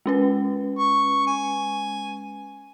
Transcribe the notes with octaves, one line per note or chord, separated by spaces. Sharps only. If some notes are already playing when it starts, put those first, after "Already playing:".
G#3 C#4 B4
C#6
G#5